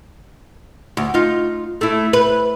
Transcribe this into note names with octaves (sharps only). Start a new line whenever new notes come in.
D2
D#4 F4
A3 E4
B4